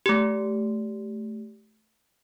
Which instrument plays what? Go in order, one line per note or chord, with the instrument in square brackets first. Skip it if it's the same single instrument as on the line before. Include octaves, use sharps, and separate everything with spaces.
[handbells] A3 G4